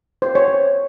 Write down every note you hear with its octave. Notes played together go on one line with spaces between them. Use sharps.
C5
C#5